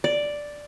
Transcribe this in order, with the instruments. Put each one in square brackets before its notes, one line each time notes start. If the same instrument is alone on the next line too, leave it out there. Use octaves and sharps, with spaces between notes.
[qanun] D5